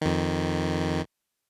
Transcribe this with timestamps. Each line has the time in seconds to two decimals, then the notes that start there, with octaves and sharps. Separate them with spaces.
0.02 F2 D#3